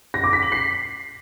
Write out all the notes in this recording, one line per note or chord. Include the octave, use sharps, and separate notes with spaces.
A#6
D6
B6
F#7
C7